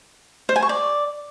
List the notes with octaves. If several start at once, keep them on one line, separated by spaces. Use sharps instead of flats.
C5
G#5
C#6
D5